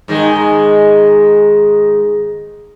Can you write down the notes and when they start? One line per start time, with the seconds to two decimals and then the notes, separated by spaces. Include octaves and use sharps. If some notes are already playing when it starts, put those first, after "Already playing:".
0.08 G#2 D#3 G#3